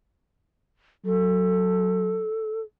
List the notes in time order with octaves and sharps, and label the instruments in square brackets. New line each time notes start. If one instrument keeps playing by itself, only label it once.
[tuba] F#3 [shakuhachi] A4